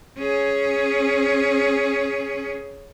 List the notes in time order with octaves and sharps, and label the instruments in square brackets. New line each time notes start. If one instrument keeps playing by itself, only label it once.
[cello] C#4 G#4